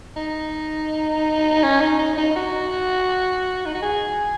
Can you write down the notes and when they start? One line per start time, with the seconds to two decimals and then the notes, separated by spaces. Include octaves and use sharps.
0.16 D#4
1.63 C#4
1.81 D#4
1.99 D#4
2.18 D#4
2.31 D#4
2.36 F#4
3.66 D#4
3.75 F#4
3.82 G#4